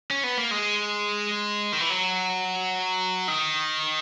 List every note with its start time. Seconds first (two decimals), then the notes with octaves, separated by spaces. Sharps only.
0.11 C#4
0.24 B3
0.38 A#3
0.51 G#3
1.72 D#3
1.81 E3
1.90 F#3
3.28 D#3